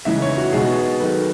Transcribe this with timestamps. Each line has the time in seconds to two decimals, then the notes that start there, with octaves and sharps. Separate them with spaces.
0.05 C#3 E3 G#3 D#4 E5
0.22 C#5
0.37 F#4
0.52 B2 G#3 B3 D#4 G#4
1.00 D#3 F#3 A3 B4